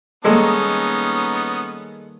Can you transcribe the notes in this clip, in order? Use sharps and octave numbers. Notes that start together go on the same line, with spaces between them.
D#3 G3 G#3 A#3 B3 C#4 D#4 A4